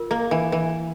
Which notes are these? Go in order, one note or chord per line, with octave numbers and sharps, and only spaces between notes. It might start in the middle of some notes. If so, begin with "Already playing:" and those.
Already playing: F4 A#4
A#3
E3
E3